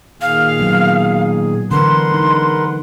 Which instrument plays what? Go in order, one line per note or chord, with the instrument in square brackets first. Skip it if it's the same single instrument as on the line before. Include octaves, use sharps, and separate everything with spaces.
[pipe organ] A#2 D#3 G#4 [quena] F5
[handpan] F#3 B3
[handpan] D3 E3 D4 [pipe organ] A#4 B4 F#5 [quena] C6
[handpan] G#3 D#4